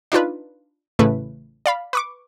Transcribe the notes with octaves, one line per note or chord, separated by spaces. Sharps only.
D4 D#4 F4 B4
A1 A2 C#3 A3 B4
D5 F5 B5
B4 C#6 D6